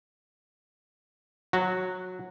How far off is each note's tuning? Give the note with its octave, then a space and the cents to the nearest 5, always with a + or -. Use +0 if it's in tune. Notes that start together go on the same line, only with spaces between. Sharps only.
F#3 -15 F#4 +0